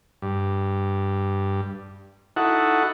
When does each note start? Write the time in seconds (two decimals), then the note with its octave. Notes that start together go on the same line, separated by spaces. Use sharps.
0.22 G2
2.36 D#4 E4 F#4 A4 F#5